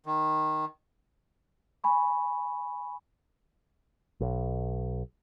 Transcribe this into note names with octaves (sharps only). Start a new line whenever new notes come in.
D#3
G#5 B5 C#6
B1